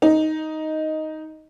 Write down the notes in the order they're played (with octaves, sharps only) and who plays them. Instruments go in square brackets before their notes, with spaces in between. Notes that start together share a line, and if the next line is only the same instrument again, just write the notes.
[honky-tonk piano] D#4